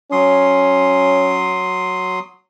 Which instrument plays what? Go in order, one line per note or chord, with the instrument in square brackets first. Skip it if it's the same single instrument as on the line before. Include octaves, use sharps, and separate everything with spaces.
[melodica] F#3 C6 D#6 [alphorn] C#4